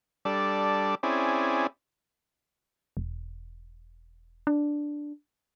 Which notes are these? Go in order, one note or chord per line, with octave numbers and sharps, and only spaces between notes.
G3 D4 A4 D5
C4 C#4 E4 G#4 D5
E1
D4